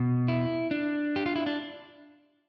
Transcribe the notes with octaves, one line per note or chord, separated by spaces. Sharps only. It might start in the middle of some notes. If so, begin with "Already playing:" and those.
Already playing: B2
E4
D4
G4
F4
E4
D4